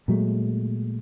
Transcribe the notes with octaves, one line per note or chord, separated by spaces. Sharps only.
A#2 F#3 G#3 A3